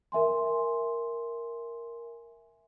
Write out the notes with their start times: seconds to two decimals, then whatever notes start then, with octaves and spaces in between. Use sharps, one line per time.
0.12 A#4 E5 G#5 C6